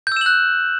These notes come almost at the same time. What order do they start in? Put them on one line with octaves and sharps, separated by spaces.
G6 E6 E7 F#7 F#6